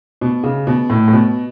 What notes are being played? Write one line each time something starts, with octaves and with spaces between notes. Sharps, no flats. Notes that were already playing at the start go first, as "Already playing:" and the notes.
B2
C#3
B2
A2
A2
B2